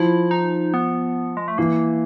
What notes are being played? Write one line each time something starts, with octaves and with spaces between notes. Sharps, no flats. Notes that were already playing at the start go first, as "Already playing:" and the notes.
Already playing: F3 E4
D#4
B3
G#3
A3
E3 A#3